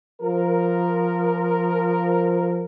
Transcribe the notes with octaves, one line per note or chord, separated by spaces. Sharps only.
F3 A#4